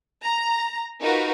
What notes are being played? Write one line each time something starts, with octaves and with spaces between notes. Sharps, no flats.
A#5
D#4 F4 F#4 A#4 B4